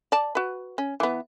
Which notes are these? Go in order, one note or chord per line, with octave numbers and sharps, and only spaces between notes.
D5 A5
F#4 B4
C#4
E3 B3